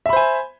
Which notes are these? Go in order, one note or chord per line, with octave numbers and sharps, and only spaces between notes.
C5 E5 G#5 B5